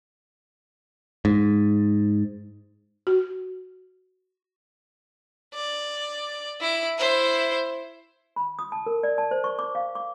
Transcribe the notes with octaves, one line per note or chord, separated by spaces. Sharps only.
G#2
F#4
D5
E4 D7
E4 C5
B5
D#6
A5
A#4
D5
A5
C5
C#6
D6
F5
D6